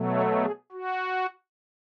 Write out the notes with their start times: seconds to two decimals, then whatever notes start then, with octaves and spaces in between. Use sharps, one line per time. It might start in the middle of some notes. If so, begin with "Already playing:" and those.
Already playing: B2 F#3 A3
0.13 C#5
0.42 G#4
0.72 F#4